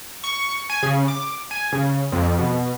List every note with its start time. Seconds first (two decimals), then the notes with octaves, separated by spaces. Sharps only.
0.24 C#6
0.70 G#5
0.83 C#3
1.08 D6
1.51 G#5
1.72 C#3
2.12 F2
2.39 B2